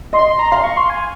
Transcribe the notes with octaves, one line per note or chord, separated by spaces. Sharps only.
D#5 C6
C6
A#5
F5 C6
C#6
C6
G#5